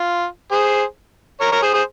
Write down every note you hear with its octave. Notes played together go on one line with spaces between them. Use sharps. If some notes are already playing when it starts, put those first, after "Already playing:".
Already playing: F4
G#4 C5
A#4 C#5
A#4 C#5
G#4 C5
G#4 C5